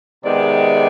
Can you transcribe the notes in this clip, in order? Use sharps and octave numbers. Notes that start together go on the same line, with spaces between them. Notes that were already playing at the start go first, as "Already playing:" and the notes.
C3 D#3 G#3 B3 D5